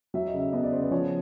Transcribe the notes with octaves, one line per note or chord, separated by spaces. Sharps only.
F#3 E5
D#5
C#3
E5
B3 D#5
D5
C#3 C5
B4
F3 C#5